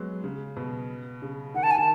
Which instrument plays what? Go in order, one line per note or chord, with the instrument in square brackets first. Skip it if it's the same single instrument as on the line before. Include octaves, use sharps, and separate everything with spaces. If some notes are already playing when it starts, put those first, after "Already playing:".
Already playing: [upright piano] F#3 G#3 B3
C#3
B2
C#3
[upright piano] D#3 [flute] F#5
[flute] A5
G#5
[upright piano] D#3 [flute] A5